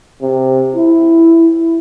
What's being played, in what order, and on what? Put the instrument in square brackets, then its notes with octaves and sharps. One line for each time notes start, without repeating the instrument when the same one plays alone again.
[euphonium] C3
E4